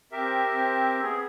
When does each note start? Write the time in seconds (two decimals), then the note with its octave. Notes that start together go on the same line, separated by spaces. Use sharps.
0.12 C4 G4 A#4 E5
0.50 C4
1.03 B3 G#4